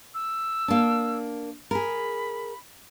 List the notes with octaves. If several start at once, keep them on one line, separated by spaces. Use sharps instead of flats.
E6
A#3 D4
G#4 A#4 B5